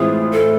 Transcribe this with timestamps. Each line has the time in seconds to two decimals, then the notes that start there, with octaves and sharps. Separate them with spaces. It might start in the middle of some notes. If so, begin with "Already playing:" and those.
Already playing: A2 E3 G#3 C4 F4 G#4
0.32 A4